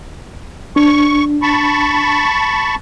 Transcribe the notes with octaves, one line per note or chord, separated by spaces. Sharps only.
D4 C#6
A5 B5 C#6